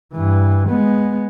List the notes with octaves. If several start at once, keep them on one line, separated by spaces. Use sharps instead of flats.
G2 E3
G#3 B3